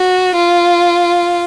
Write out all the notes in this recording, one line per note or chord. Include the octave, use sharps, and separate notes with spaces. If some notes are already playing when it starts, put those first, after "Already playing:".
Already playing: F#4
F4